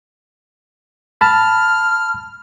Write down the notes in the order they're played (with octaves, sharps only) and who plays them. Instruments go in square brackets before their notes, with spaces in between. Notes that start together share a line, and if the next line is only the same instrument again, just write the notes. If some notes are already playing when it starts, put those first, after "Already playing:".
[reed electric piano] A5 B5 [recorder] F6